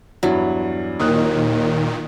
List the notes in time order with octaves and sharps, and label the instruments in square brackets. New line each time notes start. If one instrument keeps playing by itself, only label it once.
[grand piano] E2 G2 [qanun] F#3 E4
[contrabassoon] D#2 [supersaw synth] A#2 D#3 [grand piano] D#6 F#6